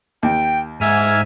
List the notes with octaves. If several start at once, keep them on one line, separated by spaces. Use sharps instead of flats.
D#2 G5
G#2 E5 G#5 F6 G#6